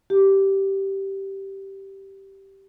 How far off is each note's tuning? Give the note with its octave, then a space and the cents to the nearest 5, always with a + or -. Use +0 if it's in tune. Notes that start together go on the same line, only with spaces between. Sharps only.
G4 -10